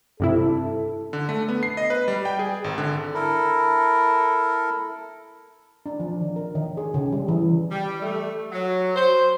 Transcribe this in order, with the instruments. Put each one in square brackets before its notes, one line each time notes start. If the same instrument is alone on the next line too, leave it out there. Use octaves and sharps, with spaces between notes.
[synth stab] G2 C3 E4 [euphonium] A4
[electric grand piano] D3
A3
B3
C7
D#5
B4
G3
G5
G#4
G#1
D3
[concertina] E4 A4 A#4
[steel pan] D4
F3
D#3
A#4
D#3
G#4
C#3
G3
E3
[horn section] G3
A3
F#3
C5